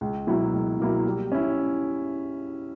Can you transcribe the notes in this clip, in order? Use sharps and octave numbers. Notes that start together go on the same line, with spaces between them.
C#2
B2 F#3 A#3 E4
C#2
B2 F#3 A#3 E4
G3
C#4 E4